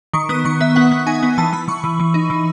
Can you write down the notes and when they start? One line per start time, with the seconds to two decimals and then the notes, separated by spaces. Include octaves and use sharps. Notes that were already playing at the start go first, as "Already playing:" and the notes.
0.13 D#3 C#6
0.29 B3 D#6
0.45 D#3 C#6
0.60 B3 E5
0.76 B3 F#5
0.91 B3
1.06 D#4 G#5
1.23 B3
1.38 E3 A5
1.53 E3 B5
1.68 E3 C#6
1.84 E3
1.99 E3
2.14 D#4
2.30 E3